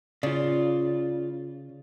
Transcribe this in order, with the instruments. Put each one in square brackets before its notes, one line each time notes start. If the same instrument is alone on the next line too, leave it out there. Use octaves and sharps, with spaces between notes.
[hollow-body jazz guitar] C#3 [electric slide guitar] F4 D5